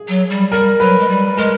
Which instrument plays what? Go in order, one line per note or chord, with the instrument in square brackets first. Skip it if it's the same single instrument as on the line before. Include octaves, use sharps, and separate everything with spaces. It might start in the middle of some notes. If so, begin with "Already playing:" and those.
Already playing: [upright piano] G#4
[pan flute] F#3
G3
[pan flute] G3 [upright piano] A#4
[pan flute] F#3 [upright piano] B4
[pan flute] G#3
G3
[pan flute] G#3 [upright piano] A#4